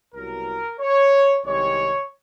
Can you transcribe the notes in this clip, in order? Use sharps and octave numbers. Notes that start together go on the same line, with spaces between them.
C2 B2 F#3 A#4
C#5
C2 C3 D#3 G#3 C#5